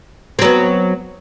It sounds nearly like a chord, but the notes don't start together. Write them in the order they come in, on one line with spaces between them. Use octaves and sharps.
C4 F#3 B3